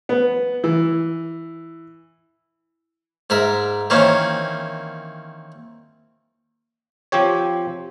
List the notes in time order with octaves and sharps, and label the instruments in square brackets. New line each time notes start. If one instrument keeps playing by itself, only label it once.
[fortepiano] B3
E3
[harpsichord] G#2 A#4 E5
D#3 E3 A#3 C4 C#4
[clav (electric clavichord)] F3 C4 G4 C#5